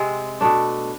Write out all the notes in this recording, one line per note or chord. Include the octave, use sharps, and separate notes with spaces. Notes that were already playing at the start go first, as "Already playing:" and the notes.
Already playing: C3 G#3 C4
B2 A3 D4